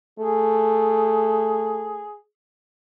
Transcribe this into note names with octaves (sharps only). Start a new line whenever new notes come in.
A3 G#4